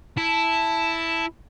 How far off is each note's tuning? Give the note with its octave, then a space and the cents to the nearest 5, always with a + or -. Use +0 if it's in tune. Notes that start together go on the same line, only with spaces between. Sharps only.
E4 +0 A5 +0